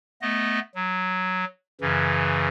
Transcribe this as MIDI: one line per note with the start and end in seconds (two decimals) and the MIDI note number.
0.22 0.60 57
0.22 0.60 59
0.22 0.60 75
0.75 1.45 54
1.81 2.48 42
1.81 2.48 49
1.81 2.48 52